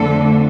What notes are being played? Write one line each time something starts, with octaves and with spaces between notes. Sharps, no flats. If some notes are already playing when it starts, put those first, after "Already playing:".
Already playing: F2 D3 A3 D4 A4